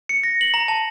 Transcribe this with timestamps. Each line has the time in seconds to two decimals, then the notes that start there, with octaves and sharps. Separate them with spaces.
0.09 C#7
0.23 A#6
0.41 F#7
0.54 A#5
0.68 A5